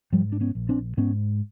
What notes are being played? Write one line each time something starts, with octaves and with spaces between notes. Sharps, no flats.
G#2 F3 G3
D4
B3 C#4
A#1
C4 D4
G#2 B3 C#4